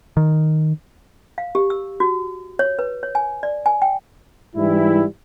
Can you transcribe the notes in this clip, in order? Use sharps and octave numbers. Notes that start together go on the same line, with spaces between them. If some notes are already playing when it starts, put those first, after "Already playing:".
D#3
F5
G4
E6
F#4
C#5
B4
C#5
G#5
D5
G#5
G5
G#2 E3 G3 E4